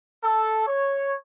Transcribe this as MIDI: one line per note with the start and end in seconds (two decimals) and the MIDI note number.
0.24 0.67 69
0.67 1.14 73